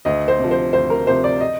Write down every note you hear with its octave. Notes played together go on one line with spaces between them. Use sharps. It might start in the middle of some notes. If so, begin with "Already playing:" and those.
D2 D#5
C5
C3 F3
C5
D2 C5
A#4
C3 F3 C5
D5
D#5